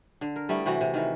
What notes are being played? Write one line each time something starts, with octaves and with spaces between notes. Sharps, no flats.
D3
A#4
G3 A3 B3 E4
C3 E3 F#4
C3
D#3 E3